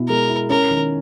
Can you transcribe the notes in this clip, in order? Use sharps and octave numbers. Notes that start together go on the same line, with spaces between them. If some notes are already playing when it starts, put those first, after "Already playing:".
Already playing: B2 B3 E4
G#3 A#4
E4
C#4 A#4
D#3